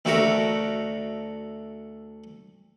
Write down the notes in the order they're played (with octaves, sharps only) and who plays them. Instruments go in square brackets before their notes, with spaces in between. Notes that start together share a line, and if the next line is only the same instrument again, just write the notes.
[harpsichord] D2 D3 A3 F#4 A#4 E5